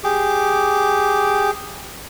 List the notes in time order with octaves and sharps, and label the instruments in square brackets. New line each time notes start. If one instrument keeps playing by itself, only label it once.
[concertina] G4 G#4 D6